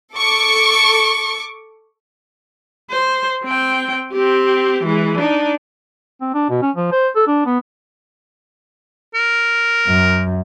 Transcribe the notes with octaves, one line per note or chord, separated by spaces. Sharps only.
A4 C#6 D6
C5
C4 G5
C4 G4
E3 G#3
D4 D#4
C4
D4
B2
C#4
F3
C5
A4
D4
B3
A#4
F#2